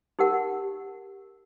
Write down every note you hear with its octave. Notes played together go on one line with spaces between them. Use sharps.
D#4 G4 A#4 F#5